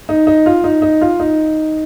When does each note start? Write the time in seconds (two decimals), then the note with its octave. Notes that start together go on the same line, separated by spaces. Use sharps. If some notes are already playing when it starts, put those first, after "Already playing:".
0.09 D#4
0.27 D#4
0.46 F4
0.64 D#4
0.82 D#4
1.01 F4
1.20 D#4